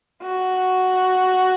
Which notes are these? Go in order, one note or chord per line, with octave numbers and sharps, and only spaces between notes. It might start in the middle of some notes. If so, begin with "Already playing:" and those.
F#4